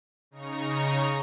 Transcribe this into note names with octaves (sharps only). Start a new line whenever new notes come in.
C#3 D#4 A#5 C#6